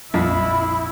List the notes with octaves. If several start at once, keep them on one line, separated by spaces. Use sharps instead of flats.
A#1 F2 E4